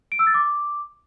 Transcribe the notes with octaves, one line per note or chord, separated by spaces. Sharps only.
D7
E6
A6
D6